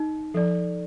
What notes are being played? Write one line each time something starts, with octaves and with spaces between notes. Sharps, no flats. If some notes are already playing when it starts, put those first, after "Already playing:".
Already playing: D#4
F3 A4 D5